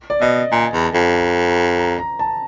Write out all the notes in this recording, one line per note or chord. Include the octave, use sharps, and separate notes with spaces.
D5
B2 D#5
A#2 G#5
E2
A5
F2
A#5
A#5
A#5
A#5
A5